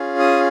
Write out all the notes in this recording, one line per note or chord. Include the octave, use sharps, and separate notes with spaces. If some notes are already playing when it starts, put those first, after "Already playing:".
Already playing: C#4 F4 G#4
D#6